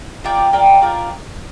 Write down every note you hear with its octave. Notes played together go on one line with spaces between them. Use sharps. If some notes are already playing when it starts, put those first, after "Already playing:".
F4 A#4 D5 G5
F4 A#4 D5 G5
F4 A#4 D5 G5